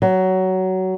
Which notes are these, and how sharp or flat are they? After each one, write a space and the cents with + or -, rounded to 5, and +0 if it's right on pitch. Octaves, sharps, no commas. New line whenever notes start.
F#3 +15